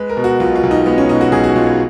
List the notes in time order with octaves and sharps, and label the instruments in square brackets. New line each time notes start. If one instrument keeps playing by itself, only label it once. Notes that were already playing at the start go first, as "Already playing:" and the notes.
Already playing: [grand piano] G#3 B4
A#4
B2
F#4
B1 F4
F4
B1
D#4
G#3 B3
C#4
B2 D#4
F#4
B1 G#4
F#4
B1 F4
G#4